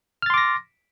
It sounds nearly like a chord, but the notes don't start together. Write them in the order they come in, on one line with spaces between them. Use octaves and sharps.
F6 A6 C6 D6 A#6